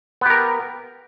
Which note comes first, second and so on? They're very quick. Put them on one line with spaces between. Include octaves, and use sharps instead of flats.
B3 G4 A#4